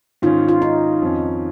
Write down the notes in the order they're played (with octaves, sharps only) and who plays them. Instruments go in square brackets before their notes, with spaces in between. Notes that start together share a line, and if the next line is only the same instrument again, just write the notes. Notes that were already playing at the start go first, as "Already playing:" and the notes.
[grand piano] G#2 D#3 C#4 [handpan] F4
[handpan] F4
D#4
[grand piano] F2 D#3 C#4